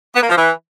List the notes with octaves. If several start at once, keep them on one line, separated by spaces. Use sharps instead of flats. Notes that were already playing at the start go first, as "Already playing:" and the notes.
B3
A#3
F3
E3